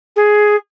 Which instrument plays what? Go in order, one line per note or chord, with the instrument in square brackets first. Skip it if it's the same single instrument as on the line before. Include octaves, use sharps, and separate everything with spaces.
[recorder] G#4